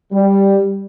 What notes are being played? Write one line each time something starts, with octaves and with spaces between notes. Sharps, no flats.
G3